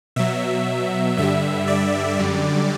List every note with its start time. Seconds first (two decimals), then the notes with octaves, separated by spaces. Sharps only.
0.16 B2 F#3 E5
1.17 G2 D3 G3 E5
1.68 D5
2.19 F#2 D3 G3